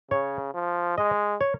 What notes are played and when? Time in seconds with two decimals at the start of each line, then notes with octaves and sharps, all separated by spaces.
0.11 C#3 C#5
0.54 F3
0.97 G#3 D#5
1.41 C#5